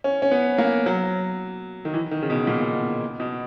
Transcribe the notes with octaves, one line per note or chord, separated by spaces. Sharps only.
C#4
C#4
B3
A#3
F#3
D#3
E3
D#3
C#3
B2
A#2
B2
B2